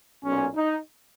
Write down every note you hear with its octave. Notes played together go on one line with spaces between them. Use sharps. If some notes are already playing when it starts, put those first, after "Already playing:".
B1 A#2 C#4
D#4